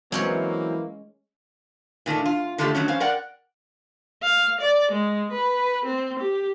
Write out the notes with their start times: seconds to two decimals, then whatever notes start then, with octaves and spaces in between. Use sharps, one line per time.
0.12 E3 F#3 G#3 A#3 C4 C#4 C#5
2.06 A#2 D#3 A3 D4
2.25 F4
2.58 D3 D#3 A3 F4 G4 A4
2.75 D#3 F#3 A3 C#4
2.88 F2 C#4 C5 F5
3.00 A#4 D5 F#5 G5
4.22 F5
4.60 D5
4.91 G#3
5.32 B4
5.85 C4
6.19 G4